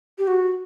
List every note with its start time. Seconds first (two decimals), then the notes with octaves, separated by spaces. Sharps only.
0.18 G4
0.27 F#4